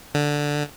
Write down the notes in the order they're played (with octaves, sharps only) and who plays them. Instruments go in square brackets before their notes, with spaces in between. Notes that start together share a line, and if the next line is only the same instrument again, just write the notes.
[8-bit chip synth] D3